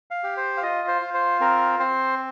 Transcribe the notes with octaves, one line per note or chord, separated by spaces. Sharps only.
F5
G4
C5
F5
F4 D#5
C5
F4
C5
C4 A#4
C4 C5